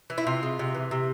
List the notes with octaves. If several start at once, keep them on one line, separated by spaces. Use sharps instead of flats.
E3
E4
C3 F4
G#3
C3
E3
C3